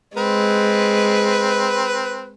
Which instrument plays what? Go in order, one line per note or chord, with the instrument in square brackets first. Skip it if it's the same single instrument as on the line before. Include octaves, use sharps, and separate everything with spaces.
[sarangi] G#3 [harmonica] C4 B4